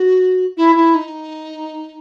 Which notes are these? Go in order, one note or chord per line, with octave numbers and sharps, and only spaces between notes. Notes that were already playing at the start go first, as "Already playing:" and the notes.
Already playing: F#4
E4
E4
D#4